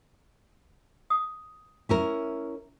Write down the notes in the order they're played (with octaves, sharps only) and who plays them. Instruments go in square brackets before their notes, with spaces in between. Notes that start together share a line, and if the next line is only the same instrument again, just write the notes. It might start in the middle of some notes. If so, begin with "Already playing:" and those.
[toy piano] D#6
[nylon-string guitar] C#4 E4 A#4